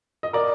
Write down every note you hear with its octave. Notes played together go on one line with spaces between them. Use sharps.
D#5
A#4 D5